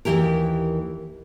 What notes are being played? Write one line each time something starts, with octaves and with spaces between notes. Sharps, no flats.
D#2 A2 E3 G4 A#4